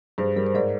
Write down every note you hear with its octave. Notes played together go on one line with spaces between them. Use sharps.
G2 G#4 C5
G3 A#4
C5
G#2 A#4 D5